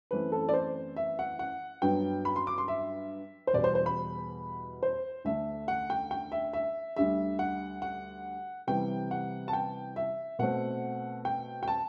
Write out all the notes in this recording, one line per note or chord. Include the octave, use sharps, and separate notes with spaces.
F#2 E3 A3 C4 B4
A4
D5
C5
E5
F#5
F#5
G2 F#3 B3 D4 G5
B5
C6
D6
C6
E5
C5
E2 B2 G3 D5
C5
C5
B5
C5
D2 D3 A3 D4 E5
F#5
G5
G5
E5
E5
D2 D3 G3 E5
F#5
F#5
C3 E3 G3 B3 G5
F#5
A5
G5
E5
B2 A3 C4 F#5
G5
G5
A5